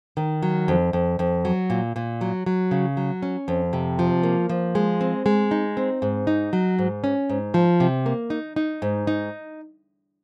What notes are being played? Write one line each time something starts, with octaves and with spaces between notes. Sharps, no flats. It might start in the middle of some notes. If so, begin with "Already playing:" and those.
D#3
F#3
F2
F2
F2
F#3
A#2
A#2
F#3
F#3
C#3
F#3
C#4
F2
C3
F3
A#3
F3
G#3
C4
G#3
D#4
C4
G#2
D#4
F#3
G#2
C#4
G#2
F3
C3
A#3
D#4
D#4
G#2
D#4